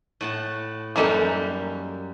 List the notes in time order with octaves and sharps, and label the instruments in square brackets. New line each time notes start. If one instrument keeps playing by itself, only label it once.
[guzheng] A2 F#5 A5
[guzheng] F#2 G3 A#3 [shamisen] E3 D#4 A4